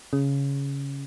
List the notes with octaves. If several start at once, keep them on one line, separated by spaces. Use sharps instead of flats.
C#3